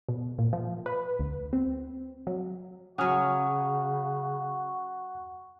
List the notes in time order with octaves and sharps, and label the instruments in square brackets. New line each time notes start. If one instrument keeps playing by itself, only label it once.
[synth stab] B2
A#2
F3
B4
D2
C4
F#3
[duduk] C#3 [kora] F#3 C#4 [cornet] F#4 [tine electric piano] F#5 D#6 F6